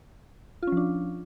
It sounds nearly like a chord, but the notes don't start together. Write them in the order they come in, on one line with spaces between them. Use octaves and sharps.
F4 C#4 F3 D4